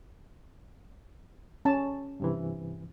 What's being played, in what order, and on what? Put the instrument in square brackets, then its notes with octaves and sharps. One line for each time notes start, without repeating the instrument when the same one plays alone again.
[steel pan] C#4 A5
[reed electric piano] G2 C3 E3